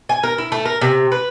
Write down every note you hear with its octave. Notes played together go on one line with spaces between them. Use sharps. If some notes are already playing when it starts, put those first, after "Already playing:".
G#5
A#4
E4
A3
A#4
C3
B4